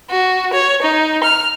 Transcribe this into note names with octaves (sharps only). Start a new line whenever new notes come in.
F#4
C#5
D#4
F6